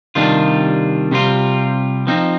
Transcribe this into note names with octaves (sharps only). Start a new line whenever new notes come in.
C3 D#3 G3 D4 F4
C3 G3 C4 F4
F3 C4 D#4